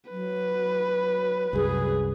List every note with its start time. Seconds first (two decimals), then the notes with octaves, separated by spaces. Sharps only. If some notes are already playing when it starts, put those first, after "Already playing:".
0.11 F#3 B4
1.53 C2 F#2 F#3 G#4